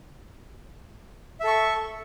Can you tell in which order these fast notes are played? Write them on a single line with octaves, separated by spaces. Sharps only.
E5 A4 C#6